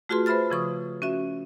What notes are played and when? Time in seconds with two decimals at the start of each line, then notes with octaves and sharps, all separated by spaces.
0.09 A3 F4 F#4 G#4 B4 C6
0.26 B4 C5 E5 B5 F6 A6
0.50 C#3 F3 C#6 D#6
1.02 C#4 F#4 E5